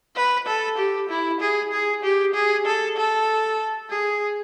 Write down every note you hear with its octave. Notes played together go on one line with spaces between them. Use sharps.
B4
A4
G4
E4
G#4
G#4
G4
G#4
A4
A4
G#4